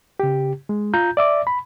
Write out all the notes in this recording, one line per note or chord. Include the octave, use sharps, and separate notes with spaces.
C#3 G4
G#3
F4 A#5 G6
D5 E5 D6
B5